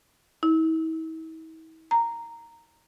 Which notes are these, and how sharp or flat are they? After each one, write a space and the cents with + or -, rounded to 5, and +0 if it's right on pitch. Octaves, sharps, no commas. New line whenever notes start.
E4 -45
A#5 -5